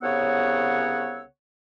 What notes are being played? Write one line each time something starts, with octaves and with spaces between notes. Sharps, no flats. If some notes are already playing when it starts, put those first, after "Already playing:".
C2 C#3 B3 C#5 F#5 E6